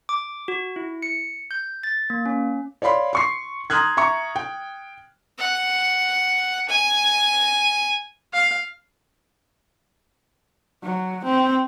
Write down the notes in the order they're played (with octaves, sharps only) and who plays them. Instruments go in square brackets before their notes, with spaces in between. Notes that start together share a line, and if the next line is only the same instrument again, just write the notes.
[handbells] D6
F#4
E4
C#7
G6
A6
A#3
C#4
[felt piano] C#5 D5 F5 B5 C6
C6 C#6 C7
A#5 C6 D#6 F6 F#6 G#6
E5 A#5 C#6
G5
[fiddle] F#5
G#5
[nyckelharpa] F5
[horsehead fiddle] F#3
C4